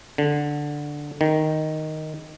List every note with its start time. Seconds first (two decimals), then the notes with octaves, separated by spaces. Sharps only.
0.18 D3
1.21 D#3